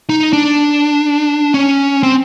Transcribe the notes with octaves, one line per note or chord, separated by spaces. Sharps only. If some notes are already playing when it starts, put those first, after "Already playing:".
D#4
D4
C#4
C4